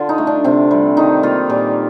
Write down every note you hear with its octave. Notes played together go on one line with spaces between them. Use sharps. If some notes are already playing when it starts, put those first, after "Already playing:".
Already playing: D3 F4
D#4
A3
D4
C3 C4
G3
D#3 D#4
A#3 F4
A#2 G4